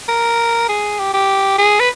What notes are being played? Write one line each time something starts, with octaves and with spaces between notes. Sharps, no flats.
A#4
G#4
G4
G4
G#4
B4